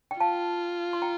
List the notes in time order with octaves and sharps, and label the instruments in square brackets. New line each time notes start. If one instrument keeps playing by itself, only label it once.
[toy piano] G5
[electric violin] F4 [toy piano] F5 A5
[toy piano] C6
G5 A#5